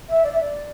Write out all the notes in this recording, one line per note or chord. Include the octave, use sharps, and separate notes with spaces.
E5
D5
E5
D5